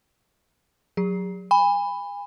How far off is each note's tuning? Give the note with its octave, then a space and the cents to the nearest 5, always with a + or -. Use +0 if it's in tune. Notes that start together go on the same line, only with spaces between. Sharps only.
F#3 -15 G#4 -40
G#5 -35 B5 +10